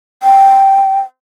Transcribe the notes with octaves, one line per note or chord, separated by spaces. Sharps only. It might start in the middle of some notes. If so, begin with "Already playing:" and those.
G5